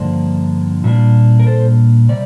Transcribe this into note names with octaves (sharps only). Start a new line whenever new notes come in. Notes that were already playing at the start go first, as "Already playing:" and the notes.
Already playing: G2 D3 F3 A#3 D4
A#2 G3 A#3 D4
A#4
A4 C5
C3 G3 D5